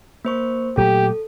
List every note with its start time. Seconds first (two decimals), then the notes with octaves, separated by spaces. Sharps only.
0.25 A#3 C5 C#6
0.77 A#2 F#3 A3 G4 A4